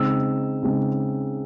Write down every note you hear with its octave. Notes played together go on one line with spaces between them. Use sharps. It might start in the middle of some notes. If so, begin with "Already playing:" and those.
Already playing: C#3 G#3 C4 D#4 E6
C#3 G#3 C4 D#4